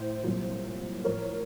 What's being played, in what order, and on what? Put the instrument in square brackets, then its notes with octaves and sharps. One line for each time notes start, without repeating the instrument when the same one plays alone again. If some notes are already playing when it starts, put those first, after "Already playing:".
Already playing: [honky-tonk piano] A2 C5
C2 A#2 F#3
A2 F3 A#4 C#5